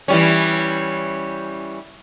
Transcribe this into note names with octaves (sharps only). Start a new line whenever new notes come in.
E3 G3 C#4